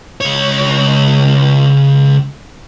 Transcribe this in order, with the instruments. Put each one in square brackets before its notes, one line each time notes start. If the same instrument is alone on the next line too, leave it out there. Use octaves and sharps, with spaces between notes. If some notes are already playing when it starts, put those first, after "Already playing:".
[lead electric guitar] C#2 C#5